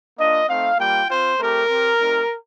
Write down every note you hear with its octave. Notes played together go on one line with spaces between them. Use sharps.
A#3 D4 F4 D#5
A3 C4 D#4 F5
G3 A#3 F4 G5
C4 F4 C5
A3 C4 G4 A#4
C4 G4
A3 C4 D#4 G4